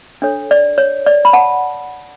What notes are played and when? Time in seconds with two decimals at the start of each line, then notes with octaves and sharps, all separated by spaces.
0.22 D4 A4 C#5
0.51 D5
0.78 C#5
1.06 D5
1.25 B5
1.33 F#5 A5